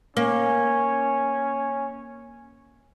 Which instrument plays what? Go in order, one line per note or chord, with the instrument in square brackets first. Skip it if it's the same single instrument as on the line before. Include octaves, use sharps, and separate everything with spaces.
[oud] A#3 [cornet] C#4